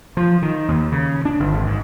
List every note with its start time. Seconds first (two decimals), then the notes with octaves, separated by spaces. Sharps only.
0.17 F3
0.42 D#3
0.68 D#2
0.92 C#3
1.25 D4
1.40 G1
1.54 G#1
1.66 G#2